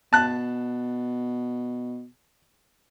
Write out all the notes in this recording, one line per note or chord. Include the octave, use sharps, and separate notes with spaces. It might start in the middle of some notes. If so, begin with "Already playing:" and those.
B2 A5 F#6